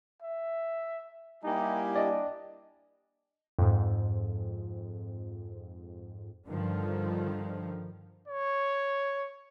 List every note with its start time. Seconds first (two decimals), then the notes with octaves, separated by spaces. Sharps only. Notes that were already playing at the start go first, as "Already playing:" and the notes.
0.22 E5
1.44 G3 A#3 D#4 E4 G4 G#5
1.96 D4 D5 D#5
3.59 F2 G#2
6.47 G2 D3 D#3 F3
8.28 C#5